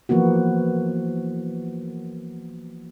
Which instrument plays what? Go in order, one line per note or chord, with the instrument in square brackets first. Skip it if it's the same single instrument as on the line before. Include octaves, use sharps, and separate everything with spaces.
[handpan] E3 F3 A#3 B3 F#4